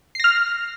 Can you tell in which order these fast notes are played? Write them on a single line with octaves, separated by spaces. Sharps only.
C7 A#6 F6